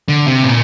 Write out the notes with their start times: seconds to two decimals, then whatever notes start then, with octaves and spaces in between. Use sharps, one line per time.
0.09 D3
0.28 C3
0.43 A2
0.48 A#2